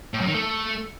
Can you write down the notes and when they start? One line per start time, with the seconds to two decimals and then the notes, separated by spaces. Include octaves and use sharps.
0.14 A2
0.21 F#2
0.28 D#3
0.35 A3